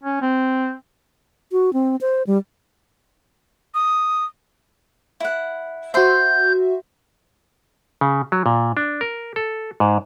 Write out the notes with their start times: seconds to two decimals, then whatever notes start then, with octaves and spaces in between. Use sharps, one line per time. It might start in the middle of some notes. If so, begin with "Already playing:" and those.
0.03 C#4
0.22 C4
1.52 F#4
1.73 C4
2.01 C5
2.27 G3
3.74 D#6
5.20 E4 F#5
5.94 F#4 C5 E5 B5 C6 G6
8.01 C#3
8.32 F#3
8.46 A#2
8.77 D4
9.01 A#4
9.36 A4
9.80 G#2